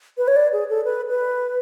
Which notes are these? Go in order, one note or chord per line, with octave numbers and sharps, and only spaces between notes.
B4
C#5
D5
G#4
A4
B4
B4